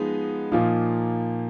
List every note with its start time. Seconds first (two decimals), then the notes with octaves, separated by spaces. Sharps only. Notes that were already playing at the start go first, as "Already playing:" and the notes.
Already playing: F3 G#3 B3 D#4
0.52 A#2 F3 A#3 D#4